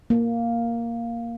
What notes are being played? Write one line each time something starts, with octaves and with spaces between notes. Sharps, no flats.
A#3